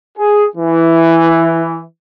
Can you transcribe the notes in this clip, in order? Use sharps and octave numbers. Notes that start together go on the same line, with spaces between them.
G#4
E3